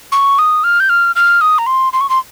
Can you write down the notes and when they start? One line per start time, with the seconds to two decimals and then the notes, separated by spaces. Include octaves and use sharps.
0.12 C#6
0.39 D#6
0.64 F6
0.80 G6
0.89 F6
1.16 F6
1.41 D#6
1.58 A#5
1.66 C6
1.93 C6
2.01 C#6
2.10 C6